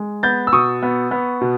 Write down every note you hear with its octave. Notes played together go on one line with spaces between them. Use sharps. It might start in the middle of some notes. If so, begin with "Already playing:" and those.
Already playing: G#3
B3 G6 A6
E6
B2 C#6 D#6
B3
B3
B2